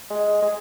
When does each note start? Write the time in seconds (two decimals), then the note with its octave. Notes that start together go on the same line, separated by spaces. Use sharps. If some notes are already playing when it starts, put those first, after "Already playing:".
0.10 G#3
0.42 G#3